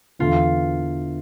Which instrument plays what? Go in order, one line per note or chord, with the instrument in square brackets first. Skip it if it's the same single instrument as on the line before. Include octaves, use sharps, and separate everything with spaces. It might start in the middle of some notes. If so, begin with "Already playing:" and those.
[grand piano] E2 D3 A3 [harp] F4